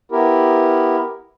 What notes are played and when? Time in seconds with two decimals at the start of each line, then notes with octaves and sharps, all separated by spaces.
0.12 B3 E4 G4 A#4